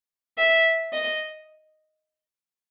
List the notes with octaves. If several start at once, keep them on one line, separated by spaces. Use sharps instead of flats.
E5
D#5